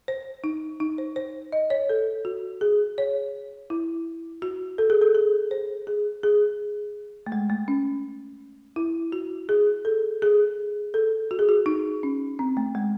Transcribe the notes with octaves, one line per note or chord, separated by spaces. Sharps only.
C5
D#4
D#4
C5
C5
D#5
C#5
A4
F#4
G#4
C#5
E4
F#4
A4
G#4
A4
G#4
C5
G#4
G#4
A3
G#3
A3
C#4
E4
F#4
G#4
A4
G#4
A4
F#4
G#4
F#4
D#4
C#4
C4
A3
G#3